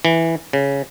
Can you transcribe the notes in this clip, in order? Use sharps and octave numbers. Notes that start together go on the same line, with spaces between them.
E3
C#3